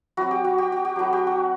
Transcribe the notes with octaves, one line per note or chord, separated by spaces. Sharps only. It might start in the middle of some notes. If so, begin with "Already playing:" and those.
F#3 C4 E4 F#4
G4
F#4
G4
F#4
G4
F#3 A3 E4 F#4
G4
F#4